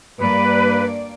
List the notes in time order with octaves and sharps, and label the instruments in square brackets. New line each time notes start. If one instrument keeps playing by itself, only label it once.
[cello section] G2 A#3 D5 [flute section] B4